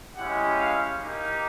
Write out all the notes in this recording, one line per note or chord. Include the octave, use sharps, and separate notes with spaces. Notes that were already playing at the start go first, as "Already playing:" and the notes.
G#3 C#4 E4 G4 F#5
F5
A#3 D#4 G4